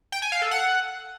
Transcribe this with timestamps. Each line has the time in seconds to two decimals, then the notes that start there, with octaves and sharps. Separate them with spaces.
0.12 G5
0.22 G#5
0.32 F5
0.42 A4
0.51 F#5